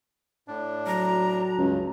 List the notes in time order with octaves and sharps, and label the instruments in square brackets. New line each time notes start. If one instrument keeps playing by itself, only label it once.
[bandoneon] A2 D4
[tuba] F#3 [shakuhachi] A#5
[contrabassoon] C#2 [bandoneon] G2